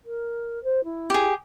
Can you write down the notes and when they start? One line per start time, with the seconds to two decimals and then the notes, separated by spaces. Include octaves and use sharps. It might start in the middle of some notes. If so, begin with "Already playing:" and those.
0.05 A#4
0.64 C5
0.84 E4
1.10 G4 G#4